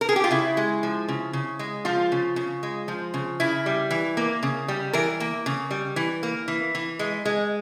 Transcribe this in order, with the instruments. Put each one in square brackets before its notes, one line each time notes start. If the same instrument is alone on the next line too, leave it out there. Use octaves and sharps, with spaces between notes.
[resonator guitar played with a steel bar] A#4
G#4
G4
F4
C#3 E4
G#3
F3
C#3
C#3
G#3
F3 F4
C#3
C#3
G#3
F3
C#3
C#3 E4
G3
E3
A#3
C#3
G3
E3 A#4
A#3
C#3
G3
E3
A#3
E3
E3
G#3
G#3